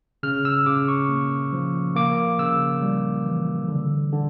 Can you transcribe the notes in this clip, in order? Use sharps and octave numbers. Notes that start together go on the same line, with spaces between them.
C#3 F6
E6
C#3 D6
C#6
A#3
F3
A#3 D6
C#3 E6
G3
E3
D3
D3